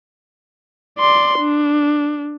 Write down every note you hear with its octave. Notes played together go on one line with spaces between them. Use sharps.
D5 C6
D4